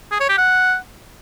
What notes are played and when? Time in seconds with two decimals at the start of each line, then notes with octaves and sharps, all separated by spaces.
0.12 G#4
0.20 C#5
0.29 G4
0.38 F#5